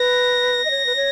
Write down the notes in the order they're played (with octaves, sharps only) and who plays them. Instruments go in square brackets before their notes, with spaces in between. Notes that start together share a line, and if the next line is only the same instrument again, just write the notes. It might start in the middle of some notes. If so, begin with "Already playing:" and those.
Already playing: [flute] B4 [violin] A#6
[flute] D#5
C#5
B4
C#5